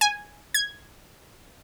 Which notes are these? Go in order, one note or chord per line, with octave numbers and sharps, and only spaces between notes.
G#5
G#6